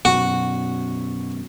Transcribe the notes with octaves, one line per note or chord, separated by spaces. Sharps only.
F#2 B2 F#4